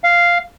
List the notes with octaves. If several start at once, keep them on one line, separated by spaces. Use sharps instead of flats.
F5